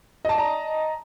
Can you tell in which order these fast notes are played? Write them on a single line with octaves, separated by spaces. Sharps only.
D#5 A5 D5 A#5